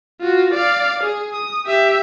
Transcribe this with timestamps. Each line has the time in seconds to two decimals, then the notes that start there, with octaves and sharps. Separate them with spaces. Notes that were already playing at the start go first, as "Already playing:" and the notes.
0.21 F4 F#4
0.54 D5 F5
1.04 G#4
1.33 D#6
1.66 G4 E5